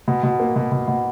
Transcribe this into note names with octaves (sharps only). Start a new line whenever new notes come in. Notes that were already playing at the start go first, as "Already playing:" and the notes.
B2
B2
A#3
B2
B2
B2